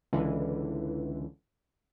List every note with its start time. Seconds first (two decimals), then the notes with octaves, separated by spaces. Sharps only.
0.13 C#2 D3 E3